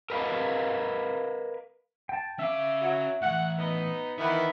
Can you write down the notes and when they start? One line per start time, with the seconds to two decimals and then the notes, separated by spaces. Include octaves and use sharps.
0.10 A#4 B4 D#5 F5
2.09 G5 A5
2.39 C#4 E5 F5 D6
2.81 F#3
3.21 A2 E3 F#5
3.58 B3 D#4
4.18 D#3 E3 B3 B4 E5